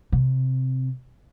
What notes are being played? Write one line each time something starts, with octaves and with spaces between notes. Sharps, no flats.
C3